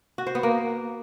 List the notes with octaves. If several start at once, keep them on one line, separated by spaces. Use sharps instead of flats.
F#4
C5
B3
A#3